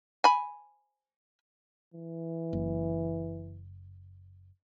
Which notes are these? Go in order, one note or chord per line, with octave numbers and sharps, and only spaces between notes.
G#5 B5
E3
F#1